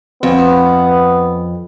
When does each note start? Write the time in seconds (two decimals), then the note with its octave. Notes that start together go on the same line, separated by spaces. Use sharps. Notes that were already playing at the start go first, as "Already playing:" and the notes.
0.23 F2 B3